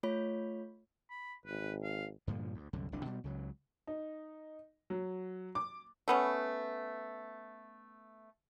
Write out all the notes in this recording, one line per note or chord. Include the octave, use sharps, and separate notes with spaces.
A3 F4 C#5 B5
B5
G#1 B4
F5
G2 A#2 D3 F3
D2
C2 F#2 D3
F1 C2 D3 D4
B2 G3
C#2 C#3 F#3
D#4
F#3
D6
A3 B3 C#4